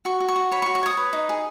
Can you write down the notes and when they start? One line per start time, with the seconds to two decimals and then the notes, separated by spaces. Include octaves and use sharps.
0.05 F#4 C#6
0.20 F#4
0.28 C#6
0.36 F#4
0.52 C#5 B5
0.62 C#6
0.66 F#4
0.75 C#6
0.83 C#5 D#6
0.97 B4
1.13 D#4
1.29 G#4